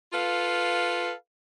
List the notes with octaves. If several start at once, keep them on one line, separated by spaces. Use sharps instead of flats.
F4 A4 B4 F5